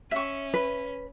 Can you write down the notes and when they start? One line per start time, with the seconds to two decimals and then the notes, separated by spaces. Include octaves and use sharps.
0.11 C#4 E5 C#6
0.54 B4